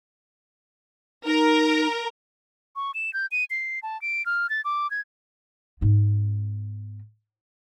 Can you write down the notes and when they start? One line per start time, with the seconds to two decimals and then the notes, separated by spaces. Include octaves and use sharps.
1.25 D#4 A#4
2.76 C#6
2.94 E7
3.14 G6
3.32 D#7
3.50 C7
3.83 A5
4.02 D7
4.26 F6
4.50 A6
4.65 D6
4.91 G#6
5.81 G#2 B3